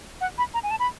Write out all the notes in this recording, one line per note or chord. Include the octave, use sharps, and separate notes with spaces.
F#5
B5
A#5
G#5
A5
B5